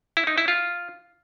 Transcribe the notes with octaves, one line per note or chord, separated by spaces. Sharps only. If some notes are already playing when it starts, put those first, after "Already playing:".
E4
D#4
E4
F4